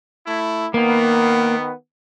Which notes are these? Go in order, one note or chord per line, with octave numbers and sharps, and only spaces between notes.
A3 E4
D#3 A#3 B3